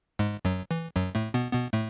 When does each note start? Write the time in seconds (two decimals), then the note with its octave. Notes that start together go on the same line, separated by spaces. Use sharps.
0.19 G#2 G#3
0.45 F#2 F#3
0.71 E3
0.96 F#2 F#3
1.15 A2 A3
1.34 B2 B3
1.53 B2 B3
1.73 A2 A3